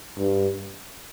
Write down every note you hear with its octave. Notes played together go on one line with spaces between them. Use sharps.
G2